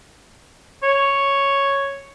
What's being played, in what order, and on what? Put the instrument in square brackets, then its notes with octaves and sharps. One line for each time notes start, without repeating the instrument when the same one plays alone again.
[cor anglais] C#5